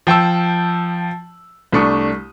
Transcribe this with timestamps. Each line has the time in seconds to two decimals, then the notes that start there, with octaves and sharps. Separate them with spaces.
0.07 F3 G5 A5 E6
1.72 C2 A3 D4 C#6 D#6